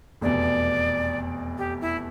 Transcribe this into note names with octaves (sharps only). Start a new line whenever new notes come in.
F1 E2 B2 D5
G4
E4